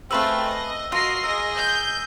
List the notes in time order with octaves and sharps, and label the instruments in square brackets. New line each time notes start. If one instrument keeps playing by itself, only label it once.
[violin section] A3 C4 F4 [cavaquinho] G#4 B4 F5 [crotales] E6 F#7
[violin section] D#5
[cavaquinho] F4 [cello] F#4 A#4 [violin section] D#5 C7 [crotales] E6 D#7
[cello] G#4 A#4 [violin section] D#5 [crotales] E6
[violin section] G6